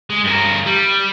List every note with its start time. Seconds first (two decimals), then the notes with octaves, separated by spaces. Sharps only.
0.10 G#3
0.24 G2 A#4
0.66 G3